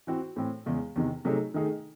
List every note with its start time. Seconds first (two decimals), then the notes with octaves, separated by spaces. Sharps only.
0.07 E3 C4 F#4
0.36 A2 E3 C4
0.66 E2 C#3 G#3
0.96 E2 C3 D#3
1.25 C3 F#3 A3 D#4 G#4
1.54 D#3 A3 D#4 G#4